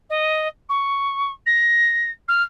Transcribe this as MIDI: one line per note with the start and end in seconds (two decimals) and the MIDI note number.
0.09 0.47 75
0.69 1.32 85
1.46 2.10 94
2.28 2.42 89